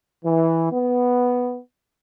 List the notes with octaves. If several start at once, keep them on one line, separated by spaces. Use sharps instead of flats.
E3
B3